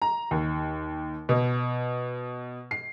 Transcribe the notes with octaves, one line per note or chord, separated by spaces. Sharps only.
A#5
D#2
B2
C7